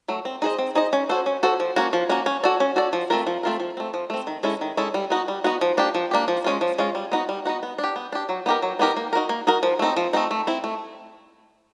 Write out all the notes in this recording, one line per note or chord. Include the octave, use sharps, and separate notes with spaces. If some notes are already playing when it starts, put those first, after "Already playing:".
F#3 A3
C4
D#4 G#4 C5 D#5
C4
D#4 G#4 C5 D#5
C#4
F#4 A4 C5
C#4
F#4 A4 C5
F3
A#3 C#4 F#4
F3
A#3 C#4 F#4
C#4
F#4 A4 D5
C#4
F#4 A4 D5
F3
A3 C4 F4 A#4
F3
A3 C4 F4 A#4
F3
A3 C4
F3
A3 C4
D#3
G#3 C#4 E4 A4
D#3
G#3 C#4 E4 A4
G3
B3 D#4 F#4
G3
B3 D#4 F#4
F3
A#3 D4 G4
F3
A#3 D4 G4
F3
G#3 C#4 F4
F3
G#3 C#4 F4
G3
B3 D#4 F#4
G3
B3 D#4 F#4
B3
D4
G4
B3
D4 G4
F#3
B3 D#4 G4 A#4
F#3
B3 D#4 G4 A#4
A#3
D#4 F#4 A#4
A#3
D#4 F#4 A#4
F3
A3 C4 D#4
F3
A3 C4 D#4
A3
C4 E4
A3